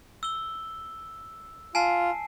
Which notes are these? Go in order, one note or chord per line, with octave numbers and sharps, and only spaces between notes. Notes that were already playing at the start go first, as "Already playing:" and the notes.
E6 G7
F4 G#5 A5 C7